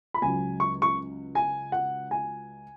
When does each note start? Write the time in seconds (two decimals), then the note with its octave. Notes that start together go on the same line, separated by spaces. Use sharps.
0.14 B5
0.22 C#2 C#3 F#3 G#5
0.60 C#6
0.82 C#6
1.35 G#5
1.72 F#5
2.11 G#5